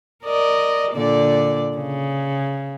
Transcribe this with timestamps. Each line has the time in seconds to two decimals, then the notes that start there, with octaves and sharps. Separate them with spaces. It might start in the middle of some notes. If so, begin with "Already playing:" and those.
0.25 A#4 D5 D#5
0.93 A#2 D3 D5
1.77 C#3